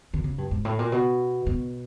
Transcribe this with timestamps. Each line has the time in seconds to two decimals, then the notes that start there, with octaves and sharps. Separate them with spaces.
0.14 D3
0.24 C#3
0.38 G2
0.51 G#2
0.65 A2
0.79 A#2
0.92 B2
1.46 B2